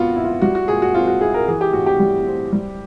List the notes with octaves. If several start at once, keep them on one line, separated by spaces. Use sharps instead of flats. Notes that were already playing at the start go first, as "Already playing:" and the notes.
Already playing: A#2 B3 F4 F#4
E4
F4
G3 F#4
F#4
A#2 G#4
F#4
C4 F4
F#4
E4 G#4
A#4
E3 G#4
G4
A2 F#4
G4
G3
C4
G3